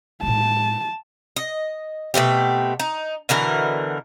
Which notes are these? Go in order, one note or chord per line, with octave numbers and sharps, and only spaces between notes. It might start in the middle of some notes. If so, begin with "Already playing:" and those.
A2 G#3 A5
D#5
B2 A3 C4 G4
D#4
B2 D3 E3 A#4